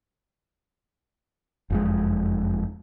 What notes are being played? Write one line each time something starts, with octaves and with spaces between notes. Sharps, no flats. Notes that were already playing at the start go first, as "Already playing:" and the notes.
F#1 F2 G#3